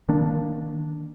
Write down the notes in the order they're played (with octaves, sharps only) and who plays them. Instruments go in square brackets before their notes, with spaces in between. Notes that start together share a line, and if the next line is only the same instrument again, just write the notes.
[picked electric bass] D#3 A#3 D4